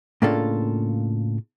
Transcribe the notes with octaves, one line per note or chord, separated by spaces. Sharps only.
A2 C#3 A#3 D4 F4 A4